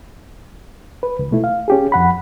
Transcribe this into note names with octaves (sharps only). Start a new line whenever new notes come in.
B4
C#2
B2 A3 E4
F5
C#4 G4 G#4
F2 F#5 B5